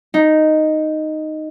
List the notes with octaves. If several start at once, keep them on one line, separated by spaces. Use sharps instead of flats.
D#4